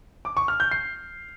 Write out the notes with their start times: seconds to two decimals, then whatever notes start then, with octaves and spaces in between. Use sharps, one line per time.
0.25 D6
0.37 C#6
0.48 F6
0.60 G6
0.71 C7